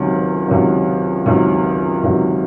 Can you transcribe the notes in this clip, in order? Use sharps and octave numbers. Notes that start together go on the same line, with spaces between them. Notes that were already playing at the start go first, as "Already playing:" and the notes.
Already playing: C#2 C3 D#3 F#3
C#2 C3 D#3 F#3
C#2 C3 D#3 F#3
C#2 C3 D#3 F#3